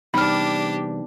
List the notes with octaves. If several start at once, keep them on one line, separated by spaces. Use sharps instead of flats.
E2 C3 G3 D4 D#4 G4 B5 F6